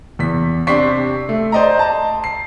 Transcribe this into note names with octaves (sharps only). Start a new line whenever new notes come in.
E2 B6
C3 C4 D4 C#6 B6 C7
A3
C5 D5 D#5 G5 A#5
A5 A#5
C7